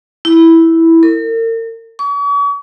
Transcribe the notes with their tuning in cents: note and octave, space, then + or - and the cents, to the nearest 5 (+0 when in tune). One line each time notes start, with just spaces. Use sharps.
E4 -5
A#4 -40
C#6 +45